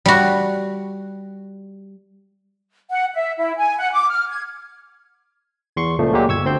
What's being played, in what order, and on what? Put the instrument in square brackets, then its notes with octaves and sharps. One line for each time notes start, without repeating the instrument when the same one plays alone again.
[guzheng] G3 F#4
[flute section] F#5
E5
E4
G#5
F#5
D6
F6
G#6
[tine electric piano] E2 C6 C#6 C#7
C#2 A#2 F3 A3
A#2 F#3 G#3 A#3 G4
G1 C#6 E6 G#6
D2 C4 C6 G6